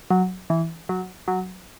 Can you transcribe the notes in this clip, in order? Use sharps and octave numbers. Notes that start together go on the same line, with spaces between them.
F#3
E3
F#3
F#3